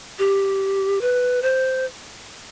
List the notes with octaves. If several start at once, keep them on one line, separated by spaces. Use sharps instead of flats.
G4
B4
C5